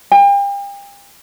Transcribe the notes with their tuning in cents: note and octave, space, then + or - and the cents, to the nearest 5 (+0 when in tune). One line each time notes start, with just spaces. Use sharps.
G5 +40